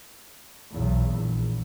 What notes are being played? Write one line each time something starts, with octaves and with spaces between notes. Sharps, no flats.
B1 E2
A#1